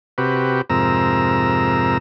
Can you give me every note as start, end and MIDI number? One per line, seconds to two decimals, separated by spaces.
0.18 0.61 48
0.18 0.61 66
0.18 0.61 67
0.18 0.61 71
0.70 1.98 41
0.70 1.98 44
0.70 1.98 48
0.70 1.98 70
0.70 1.98 82
0.70 1.98 88